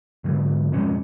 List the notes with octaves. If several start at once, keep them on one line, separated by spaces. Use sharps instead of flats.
G#2 D3 F#3
B1 F2 G#3 C#4